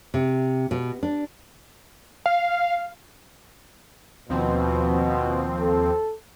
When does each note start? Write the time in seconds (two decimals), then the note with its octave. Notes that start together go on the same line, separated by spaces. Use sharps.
0.14 C3
0.71 B2
1.03 D4
2.26 F5
4.30 D#2 B2 F3 C4
5.60 A4